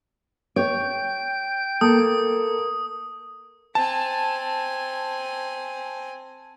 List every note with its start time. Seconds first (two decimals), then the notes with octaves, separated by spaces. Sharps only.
0.56 C#5 G5 G6
1.81 A#3 A4 D#6
3.75 C4 G#5 A5